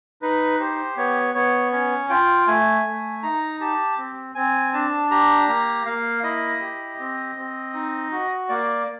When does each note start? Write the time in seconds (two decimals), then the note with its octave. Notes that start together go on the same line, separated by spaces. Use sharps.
0.22 D#4 B4
0.60 G4 C5
0.97 B3 C#5
1.35 B3 C#5
1.72 C#4 C#5
2.09 F4 G5
2.47 A3 G#5
2.85 A3
3.23 D#4 A#5
3.60 G4 A5
3.98 C4
4.35 C4 G#5
4.73 D4 A5
5.11 G4 A#5
5.48 A#3 A#5
5.86 A#3 F5
6.23 E4 D#5
6.61 G4
6.99 C4
7.37 C4
7.74 D#4
8.11 F#4
8.49 A#3 D5